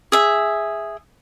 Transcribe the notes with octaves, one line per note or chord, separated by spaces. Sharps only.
G#4 E5